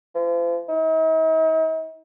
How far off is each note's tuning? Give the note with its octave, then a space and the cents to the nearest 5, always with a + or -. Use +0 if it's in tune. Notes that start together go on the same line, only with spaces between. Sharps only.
F3 -40
D#4 +45